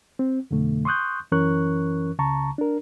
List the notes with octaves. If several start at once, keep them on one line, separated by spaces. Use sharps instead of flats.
C4
F2 B2 D3 A3
C6 C#6 D#6 F#6 G6
F#2 E3 C#4 A#4 C#6 F#6
C#2 C#3 A5 A#5 C#6
D4 A#4